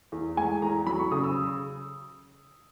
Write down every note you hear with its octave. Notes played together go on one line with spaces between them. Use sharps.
E2
G#3 G#5
E2 A#5
F#3 B5
C#6
C#3 D#6
E6